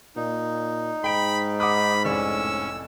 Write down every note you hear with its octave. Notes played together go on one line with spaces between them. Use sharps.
A#2 D#4
G#2 G5 B5 D7
F#5 B5 D6 D#6
F1 A2 C#4 D5 C#6 E6